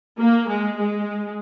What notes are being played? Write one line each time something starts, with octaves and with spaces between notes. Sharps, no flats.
A#3
G#3
G#3